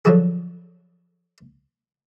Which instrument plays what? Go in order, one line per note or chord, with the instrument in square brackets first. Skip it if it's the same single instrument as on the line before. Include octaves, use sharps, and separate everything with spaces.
[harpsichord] D3 F3 F#3 F#4 G#4